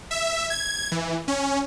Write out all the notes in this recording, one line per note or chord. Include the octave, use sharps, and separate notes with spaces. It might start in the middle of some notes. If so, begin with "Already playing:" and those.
E5
G#6
E3
C#4